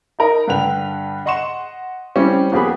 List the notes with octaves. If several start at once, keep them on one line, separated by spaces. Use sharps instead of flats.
D#4 A#4 D#5
G2 D3 B4 G5 F7
D#5 F#5 C6 C#6 E7
G3 C4 C#4 E4 G4
F2 A#3 B3 G4 G#4 B5